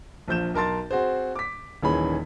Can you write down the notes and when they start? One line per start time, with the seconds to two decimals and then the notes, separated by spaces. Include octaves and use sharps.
0.28 A#1 F3 G6 E7
0.54 B1 A#4 A5 C6 A6
0.91 C4 F#4 G#4 C5
1.36 D6 B6
1.82 D#1 D#3 E3 C#4 G#4 B5